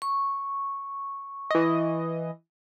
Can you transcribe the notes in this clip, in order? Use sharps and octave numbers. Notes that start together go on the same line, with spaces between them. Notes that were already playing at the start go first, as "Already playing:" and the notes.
C#6
E3 D#5